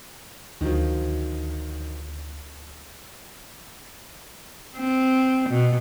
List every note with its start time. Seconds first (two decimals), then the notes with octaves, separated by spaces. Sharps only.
0.61 D2 D#3 F3 F#3
4.77 C4
5.49 B2